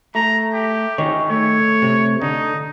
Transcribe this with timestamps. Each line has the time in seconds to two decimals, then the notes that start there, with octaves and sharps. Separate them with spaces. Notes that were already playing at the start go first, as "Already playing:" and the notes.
0.15 A3 A#5
0.53 G4
0.98 D#3 D#4 G#4 C#5
1.30 A3 C#5
1.82 C3
2.22 D3 D#4